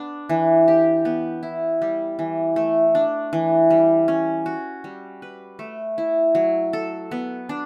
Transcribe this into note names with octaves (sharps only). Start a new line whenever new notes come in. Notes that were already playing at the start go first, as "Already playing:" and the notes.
Already playing: B3 D4
E3
G4
B3
E4
G3
E3
A3
D4
E3
G3
C#4
F#4
G3
B4
A3
E4
F#3
A4
B3
D4